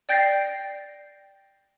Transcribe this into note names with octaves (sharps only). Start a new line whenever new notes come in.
D5 G5 G6 A6 A#6 C7